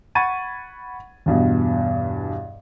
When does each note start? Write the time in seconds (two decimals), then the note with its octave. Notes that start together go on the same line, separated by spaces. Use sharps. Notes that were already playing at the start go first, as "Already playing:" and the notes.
0.15 F#5 B5 C#6 G#6 A6 D#7
1.26 E2 G2 B2